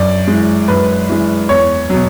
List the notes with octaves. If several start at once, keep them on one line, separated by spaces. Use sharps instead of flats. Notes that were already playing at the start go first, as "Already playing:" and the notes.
Already playing: F#2 D5
E3 G#3
F#2 B4
E3 G#3
E2 C#5
B2 F#3